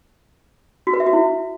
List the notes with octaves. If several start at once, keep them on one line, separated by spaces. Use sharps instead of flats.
F#4
B4
E5
F#4
E4